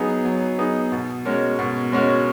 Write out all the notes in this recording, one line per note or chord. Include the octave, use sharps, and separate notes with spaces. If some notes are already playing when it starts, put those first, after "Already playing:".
Already playing: F#3 B3 D#4 G#4
F#3
B3 D#4 G#4
B2
G#3 C#4 F#4 A#4
B2
G#3 C#4 F#4 A#4